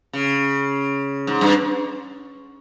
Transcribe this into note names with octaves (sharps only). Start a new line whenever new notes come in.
C#3
G#2
G2